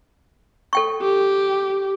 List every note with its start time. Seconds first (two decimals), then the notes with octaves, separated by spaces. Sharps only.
0.73 A4 G5 C#6
1.02 G4